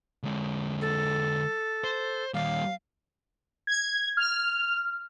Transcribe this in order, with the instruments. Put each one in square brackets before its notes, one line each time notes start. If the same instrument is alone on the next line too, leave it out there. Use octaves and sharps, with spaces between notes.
[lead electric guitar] D3 G#3
[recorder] A4
[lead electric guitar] C5
[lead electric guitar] D#2 G3 [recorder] F5
[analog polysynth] G#6
F6